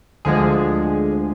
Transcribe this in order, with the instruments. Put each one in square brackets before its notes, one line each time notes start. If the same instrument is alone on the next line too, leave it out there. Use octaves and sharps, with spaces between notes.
[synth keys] D2 D3 F3 G#3 G#4